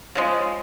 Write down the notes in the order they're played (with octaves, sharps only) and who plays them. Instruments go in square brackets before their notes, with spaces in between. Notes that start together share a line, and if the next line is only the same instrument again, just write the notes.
[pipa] C#3 F3 G#3